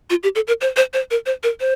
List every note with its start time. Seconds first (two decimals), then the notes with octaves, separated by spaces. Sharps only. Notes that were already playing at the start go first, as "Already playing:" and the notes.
0.10 F4
0.23 G4
0.35 A4
0.47 A#4
0.61 C5
0.76 C5
0.94 C5
1.11 A#4
1.26 C5
1.43 A#4
1.60 C5